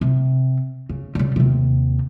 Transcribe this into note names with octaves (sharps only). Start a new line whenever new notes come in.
C3
C#3
C#3 G3
D#2 C3